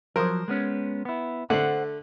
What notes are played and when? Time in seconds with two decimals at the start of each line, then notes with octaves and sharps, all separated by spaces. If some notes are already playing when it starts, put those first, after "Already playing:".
0.16 F3 F#3 A#4 C5
0.48 G#3 B3 C#4
1.05 B3 E4
1.50 D3 A3 C5 F#5